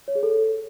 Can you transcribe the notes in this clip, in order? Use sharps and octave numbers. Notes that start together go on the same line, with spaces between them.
C#5
G#4
A4